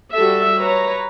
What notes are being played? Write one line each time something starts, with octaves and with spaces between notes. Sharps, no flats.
G3 F#4 A4 E5
B4 C#5 A#5